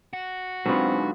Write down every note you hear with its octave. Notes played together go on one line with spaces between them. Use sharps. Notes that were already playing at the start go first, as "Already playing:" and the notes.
F#4
G#2 D3 F#3 B3 C4 F4 B4